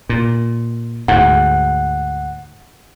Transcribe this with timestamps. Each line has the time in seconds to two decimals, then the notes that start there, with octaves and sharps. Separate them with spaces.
0.09 A#2
1.08 D2 G#2 F#5